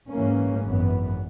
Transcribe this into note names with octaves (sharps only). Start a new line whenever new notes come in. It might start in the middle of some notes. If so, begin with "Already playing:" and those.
G#2 E3 A#3 C#4
G#1 F#2 E3 B3